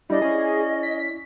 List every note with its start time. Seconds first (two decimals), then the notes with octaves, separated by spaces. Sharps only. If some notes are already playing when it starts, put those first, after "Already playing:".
0.10 G3 D4 E4 D5 D#5
0.22 C#4 G#4
0.83 B6